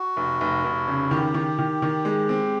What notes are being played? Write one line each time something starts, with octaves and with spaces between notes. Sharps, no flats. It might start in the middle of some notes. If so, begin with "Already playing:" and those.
Already playing: F#4
F1
F1
F1
C#3
D#3 G4
D#3
D#3
D#3
G#3
C4